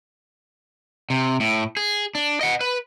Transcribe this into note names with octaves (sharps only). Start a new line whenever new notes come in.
C3
A2
G#4
D4
D#5 F#5
B4